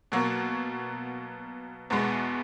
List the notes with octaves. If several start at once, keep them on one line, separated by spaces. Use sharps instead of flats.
B2 F#3 A#3
E2 B2 G#3 B3